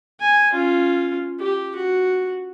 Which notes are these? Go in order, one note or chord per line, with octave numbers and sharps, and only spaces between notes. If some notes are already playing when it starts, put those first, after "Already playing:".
G#5
C#4 F4
G4
F#4